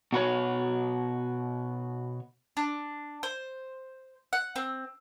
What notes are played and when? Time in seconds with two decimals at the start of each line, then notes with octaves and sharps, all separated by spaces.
0.12 B2 F#4 B4 C#5
2.57 D4
3.23 C5
4.33 F#5
4.56 C4